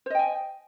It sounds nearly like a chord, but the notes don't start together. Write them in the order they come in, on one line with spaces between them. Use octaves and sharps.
C5 D#5 G5 G#5